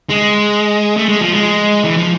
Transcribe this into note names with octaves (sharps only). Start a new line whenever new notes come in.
G#3
A3
G#3
F3
G#3
E3
F3